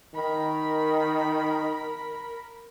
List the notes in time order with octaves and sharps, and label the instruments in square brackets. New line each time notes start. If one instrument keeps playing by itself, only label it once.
[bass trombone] D#3 [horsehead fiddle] A#4 B5